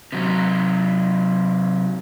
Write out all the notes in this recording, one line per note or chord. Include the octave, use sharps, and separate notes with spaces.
C3 F#3